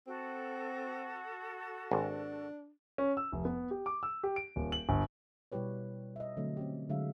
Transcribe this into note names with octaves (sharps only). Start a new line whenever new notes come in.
C4 F#4 A4
G#1 D4
C#4
E6
F1
B3
G4
D6
E6
G4
D7
D#1
F#7
G1
B2 G3 E4 G4 B4 C#5
D#5 E5
D3 F#3 A3 C4
C4 C#4 G4
D3 F#3 G#3 E5 F5